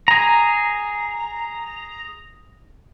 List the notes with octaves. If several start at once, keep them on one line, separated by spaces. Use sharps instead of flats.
G#4 A#5